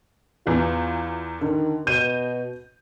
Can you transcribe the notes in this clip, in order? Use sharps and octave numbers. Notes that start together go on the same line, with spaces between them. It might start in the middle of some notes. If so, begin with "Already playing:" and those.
E2 E3 F4
D3 D#3
B2 G6 D#7 E7